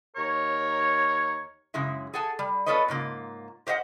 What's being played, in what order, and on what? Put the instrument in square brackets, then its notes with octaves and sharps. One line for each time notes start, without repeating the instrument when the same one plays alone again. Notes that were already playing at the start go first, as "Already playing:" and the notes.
[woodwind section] D#2 A#4 C#5
[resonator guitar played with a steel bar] F#2 C#3 G#3 E4
G#4 A4 F#5 G#5 A5
G3
B3 F4 A4 B4 C#5 D#5
G#2 C#3 A#3 F4
G4 C5 D#5 E5 F#5